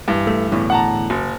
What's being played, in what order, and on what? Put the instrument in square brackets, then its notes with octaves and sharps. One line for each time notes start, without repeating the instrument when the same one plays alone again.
[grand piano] G2 E3
[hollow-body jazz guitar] A3
E2 A2 D3
[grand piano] F#5 A5 A#5
F#1